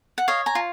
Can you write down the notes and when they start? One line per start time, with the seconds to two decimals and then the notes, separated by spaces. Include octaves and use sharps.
0.18 F#5
0.28 C#5 D#5 F5
0.46 G#5 A#5
0.55 F4